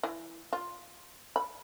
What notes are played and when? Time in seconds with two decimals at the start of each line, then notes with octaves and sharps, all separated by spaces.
0.03 E3
0.53 F4
1.36 B5